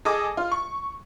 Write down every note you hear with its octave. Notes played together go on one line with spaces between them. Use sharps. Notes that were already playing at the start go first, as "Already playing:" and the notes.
G#4 A4 D#5 D6
F4
C#6